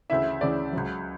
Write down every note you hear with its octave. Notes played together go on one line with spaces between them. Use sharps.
D2 C#3 E3 E4 E5
D2 C#3 E3 D5
C#2 C#3 F#3